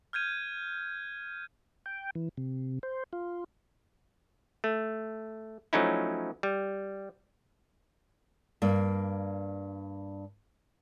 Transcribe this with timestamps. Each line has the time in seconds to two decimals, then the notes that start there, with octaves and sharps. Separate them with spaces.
0.13 F6 G6 G#6 D#7
1.86 G5
2.15 E3
2.38 C3
2.83 C5
3.13 F4
4.64 A3
5.73 F3 F#3 A3 C#4 D#4 E4
6.43 G3
8.62 G2 A#3